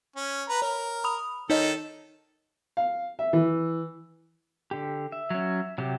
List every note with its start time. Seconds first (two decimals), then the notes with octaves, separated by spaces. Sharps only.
0.16 C#4
0.49 B4 A#5
0.62 A#4 C#5
1.04 B5 D#6 F7
1.50 D#3 D#4 A4 C#5 D#5
2.77 F5
3.19 E5
3.33 E3
4.71 D3 G4
5.12 E5
5.30 F#3 C#4
5.78 C3 F#3 G4